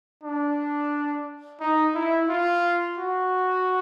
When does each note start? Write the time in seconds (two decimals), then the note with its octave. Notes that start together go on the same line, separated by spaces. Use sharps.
0.23 D4
1.60 D#4
1.94 E4
2.29 F4
2.98 F#4